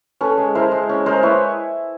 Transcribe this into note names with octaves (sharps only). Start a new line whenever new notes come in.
C#4 A4 B4
G#3
E4 A#4 C5
G#3
C#4
G#3 A#4 C5
E4 B4 C#5